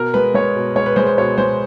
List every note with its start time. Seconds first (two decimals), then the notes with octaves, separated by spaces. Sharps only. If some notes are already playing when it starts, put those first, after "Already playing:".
Already playing: B2 A#4
0.14 G#3 B4
0.34 G#3 C#5
0.56 B2
0.76 G#3 C#5
0.86 B4
0.96 G#3 C5
1.07 C5
1.18 B2 C#5
1.38 G#3 C5